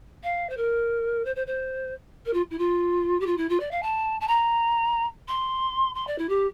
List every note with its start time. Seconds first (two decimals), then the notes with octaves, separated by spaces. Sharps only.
0.23 F5
0.49 C5
0.57 A#4
1.25 C5
1.36 C5
1.47 C5
2.26 A#4
2.33 F4
2.50 E4
2.58 F4
3.20 G4
3.26 F4
3.37 E4
3.49 F4
3.60 D5
3.71 F5
3.82 A5
4.20 A5
4.27 A#5
5.28 C6
5.95 C6
6.07 D5
6.18 E4
6.29 G4